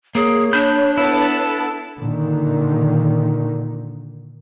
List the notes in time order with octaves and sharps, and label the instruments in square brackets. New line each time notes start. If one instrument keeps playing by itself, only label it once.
[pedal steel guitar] A#3 [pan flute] G#4 [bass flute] C#5
[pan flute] D4 [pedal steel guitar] B5 G6
[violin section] B3 A4 A5 [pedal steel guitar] E4
[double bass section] A#2 D3 D#3